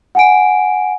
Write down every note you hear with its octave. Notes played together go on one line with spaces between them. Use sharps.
F#5 G#5 D7